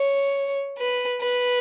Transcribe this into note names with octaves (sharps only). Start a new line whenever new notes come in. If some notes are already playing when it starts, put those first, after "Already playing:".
Already playing: C#5
B4
B4